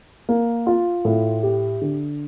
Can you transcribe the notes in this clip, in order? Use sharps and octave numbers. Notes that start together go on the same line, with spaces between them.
A#3
F4
A2
G4
D3